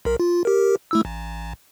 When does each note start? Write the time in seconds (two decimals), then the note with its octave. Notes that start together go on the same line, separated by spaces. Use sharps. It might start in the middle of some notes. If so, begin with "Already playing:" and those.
0.05 B1 A#4
0.20 F4
0.45 G4 A#4
0.91 A3 E4 E6
1.05 A1